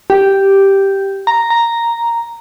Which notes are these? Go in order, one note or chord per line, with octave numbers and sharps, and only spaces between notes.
G4
A#5
A#5